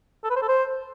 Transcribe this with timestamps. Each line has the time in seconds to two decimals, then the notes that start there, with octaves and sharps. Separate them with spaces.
0.24 A4
0.30 B4
0.36 C5
0.42 A4
0.48 C5